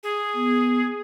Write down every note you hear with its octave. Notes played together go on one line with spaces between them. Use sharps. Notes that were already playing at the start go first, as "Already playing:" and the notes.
G#4
B3